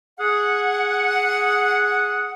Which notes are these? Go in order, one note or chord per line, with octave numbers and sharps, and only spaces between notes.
G#4 F#5